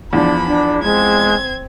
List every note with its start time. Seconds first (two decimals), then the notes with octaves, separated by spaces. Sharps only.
0.13 E2 F3 D4 B5
0.47 D4
0.83 G#3 C4 G#6